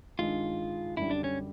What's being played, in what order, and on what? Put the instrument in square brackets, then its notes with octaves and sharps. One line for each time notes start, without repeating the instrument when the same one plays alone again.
[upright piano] G2 D#3 G#3 [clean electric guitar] F4
[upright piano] F#2 D3 G3 [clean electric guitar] E4
[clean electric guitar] D4
C#4